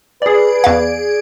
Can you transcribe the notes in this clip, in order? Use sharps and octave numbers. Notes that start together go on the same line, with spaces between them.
G#4 B4 D5
E2 F5